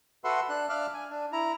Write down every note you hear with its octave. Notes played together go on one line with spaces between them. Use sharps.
F#4 A4 B4 E5 F#5 C6
D4 F#6
D4 E5 F5 D6 F6 F#6
G#5
D4
E4 A#5